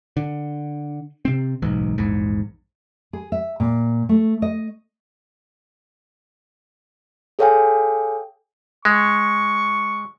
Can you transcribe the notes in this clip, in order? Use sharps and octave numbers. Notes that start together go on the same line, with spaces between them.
D3
C3 C4
D1 B1 G#2 E3
A#1 E2 G#2
G#4
E5
A#2
A3
D#5
G#4 A4 C#5 F5 G5 G#5
G#3 C#6